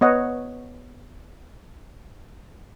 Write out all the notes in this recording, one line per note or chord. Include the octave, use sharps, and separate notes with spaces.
B3 C#5 D#5 F#5